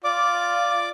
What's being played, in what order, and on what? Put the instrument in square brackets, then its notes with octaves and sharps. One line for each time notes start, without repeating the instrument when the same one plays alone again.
[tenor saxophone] F4 [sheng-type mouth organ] D5 D6